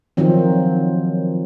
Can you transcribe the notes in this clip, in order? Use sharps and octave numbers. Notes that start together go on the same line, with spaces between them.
D#3 F3 F#3 C4